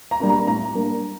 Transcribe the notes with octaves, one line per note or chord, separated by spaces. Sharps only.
A#5
G3 A#3 D4
A#5
A2 A#5
G3 A#3 D4